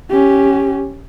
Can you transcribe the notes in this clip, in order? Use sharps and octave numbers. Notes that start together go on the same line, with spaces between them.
C#4 G4